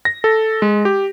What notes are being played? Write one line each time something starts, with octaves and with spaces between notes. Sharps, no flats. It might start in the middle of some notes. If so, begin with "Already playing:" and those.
A#6
A4
G#3
G4